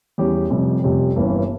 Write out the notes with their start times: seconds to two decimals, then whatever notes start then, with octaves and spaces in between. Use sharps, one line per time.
0.18 E2 E3 G3 C#4 G4
0.50 F1 F2 C3 G3 C#4
0.83 F1 F2 C3 G3 C#4
1.16 G1 G2 E3 A#3 C#4